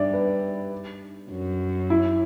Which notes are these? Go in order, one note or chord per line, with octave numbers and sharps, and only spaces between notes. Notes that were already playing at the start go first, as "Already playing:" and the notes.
Already playing: G2 D5 E5
B4
F#2
E4